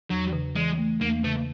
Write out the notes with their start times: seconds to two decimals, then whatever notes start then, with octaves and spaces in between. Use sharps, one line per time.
0.10 E2 F#3
0.33 C#3
0.56 E3 G#3
0.78 A3
1.01 E2 A#3
1.24 C#3 A3